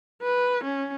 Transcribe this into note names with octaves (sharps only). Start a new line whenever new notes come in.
B4
C#4